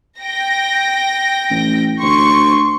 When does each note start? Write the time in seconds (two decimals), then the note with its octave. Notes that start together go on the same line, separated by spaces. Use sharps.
0.20 G5 A#6
1.50 A1
2.02 D2 C6 C#6